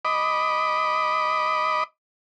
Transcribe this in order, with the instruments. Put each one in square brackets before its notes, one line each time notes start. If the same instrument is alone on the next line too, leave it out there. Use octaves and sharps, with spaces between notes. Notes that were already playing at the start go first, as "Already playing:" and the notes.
[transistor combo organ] D#5 B5 D6